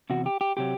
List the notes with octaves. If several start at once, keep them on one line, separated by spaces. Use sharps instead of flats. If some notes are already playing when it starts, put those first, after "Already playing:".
E2 C3 F#4
G4
G4
C3 F#3 G4